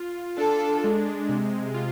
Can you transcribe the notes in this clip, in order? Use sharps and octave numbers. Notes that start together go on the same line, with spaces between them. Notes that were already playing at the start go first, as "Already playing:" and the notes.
Already playing: F4
D4 A4
G#3
C3
F4